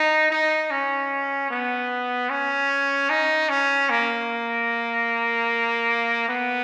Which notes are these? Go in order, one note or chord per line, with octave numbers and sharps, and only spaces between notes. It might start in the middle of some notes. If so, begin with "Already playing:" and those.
Already playing: D#4
D#4
C#4
B3
C#4
D#4
C#4
A#3
B3